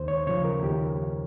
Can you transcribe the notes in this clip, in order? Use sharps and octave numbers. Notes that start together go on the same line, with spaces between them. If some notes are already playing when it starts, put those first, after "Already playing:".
Already playing: D#2 C5
C#5
C#3 F3 C#5
A#4
D#2 G4